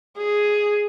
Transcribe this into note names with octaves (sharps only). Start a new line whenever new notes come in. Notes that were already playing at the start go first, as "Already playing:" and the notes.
G#4